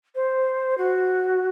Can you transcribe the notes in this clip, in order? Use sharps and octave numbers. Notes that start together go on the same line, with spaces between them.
C5
F#4